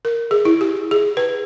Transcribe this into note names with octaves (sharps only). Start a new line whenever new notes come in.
A#4
G#4
E4
G4
G#4
B4